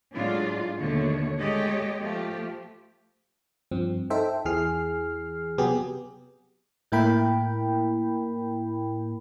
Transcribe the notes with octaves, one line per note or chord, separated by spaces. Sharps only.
A2 F#3 G#3 D4 F4
D#2 B2 D3 A3 C#5
G#3 A3 G4 C#5 D#5
F3 A3 G4
G2 F3 C4
D#4 A4 C5 E5 G5
E2 E3 G#4 F6 C7
C3 F#3 B3 G4 G#4
A2 A#3 E4 A#4 G5 B5